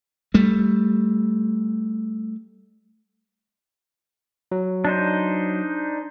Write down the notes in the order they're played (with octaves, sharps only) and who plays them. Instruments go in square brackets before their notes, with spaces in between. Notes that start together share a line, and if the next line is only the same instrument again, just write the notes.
[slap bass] G3 A3
[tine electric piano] F#3
[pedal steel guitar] D4 D#4 C5